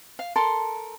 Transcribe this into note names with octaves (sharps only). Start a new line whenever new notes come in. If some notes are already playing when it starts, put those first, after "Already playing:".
F5
A4 A#4 A5 C6